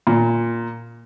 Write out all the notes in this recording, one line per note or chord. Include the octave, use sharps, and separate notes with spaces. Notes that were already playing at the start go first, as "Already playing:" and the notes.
A#2